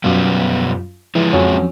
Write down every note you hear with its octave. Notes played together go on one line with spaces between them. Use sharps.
F#2 B2 G3 B3 F4
E3 F3 G#3
F2 F#3 C#4